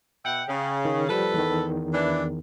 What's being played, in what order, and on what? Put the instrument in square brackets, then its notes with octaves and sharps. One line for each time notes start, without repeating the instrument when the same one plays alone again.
[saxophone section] B2 E5 F#5 [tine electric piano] G5
[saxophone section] C#3
[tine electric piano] D#3
[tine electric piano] F3 G3 [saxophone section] A4 B4
[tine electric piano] E2 D#3
[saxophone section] E3 D4